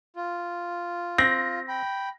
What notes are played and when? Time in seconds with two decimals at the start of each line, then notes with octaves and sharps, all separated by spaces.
0.16 F4
1.18 C4 A#6
1.68 G5 B5